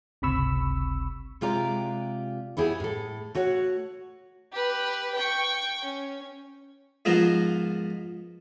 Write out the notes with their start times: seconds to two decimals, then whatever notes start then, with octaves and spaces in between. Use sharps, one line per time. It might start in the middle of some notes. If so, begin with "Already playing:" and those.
0.22 G1 C#2 C3 B5 C#6 E6
1.41 C3 G#3 F4 G4 D5 A#5
2.57 B3 E4 G4 G#4
2.80 A2 A4
3.35 A3 F#4 C#5 F#5
4.52 G4 B4
5.15 G5 C#6
5.84 C#4
7.05 G#2 F3 B3 A#4